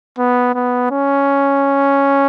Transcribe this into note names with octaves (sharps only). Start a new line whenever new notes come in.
B3
B3
C#4